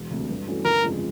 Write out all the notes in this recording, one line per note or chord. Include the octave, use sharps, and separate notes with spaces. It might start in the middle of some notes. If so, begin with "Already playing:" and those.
Already playing: E1
D2 C3
G2
E3 A3 C#4 F#4
G1 A#4
F2 C#3 F3 G#3